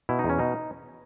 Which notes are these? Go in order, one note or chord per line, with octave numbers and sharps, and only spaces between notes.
B2 E4
D#4
E2
C#4
B2 D#4